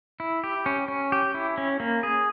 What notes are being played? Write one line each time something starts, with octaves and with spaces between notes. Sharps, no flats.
E4
G4
C#4
C#4
G4
E4
C#4
A#3
G#4